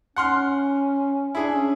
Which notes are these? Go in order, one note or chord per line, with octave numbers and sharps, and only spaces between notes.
C#4 F#5 C6 F6
D4 E4 G#4
C#4